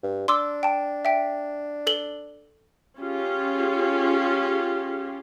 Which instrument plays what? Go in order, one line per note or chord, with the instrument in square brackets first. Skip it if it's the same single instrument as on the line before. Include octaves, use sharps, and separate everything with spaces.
[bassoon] G2
[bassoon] D4 [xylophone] C6 D6 E6
[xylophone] G5 A5
E5 G5
A4 F#7 G7
[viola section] C#4 F4 G4 G#4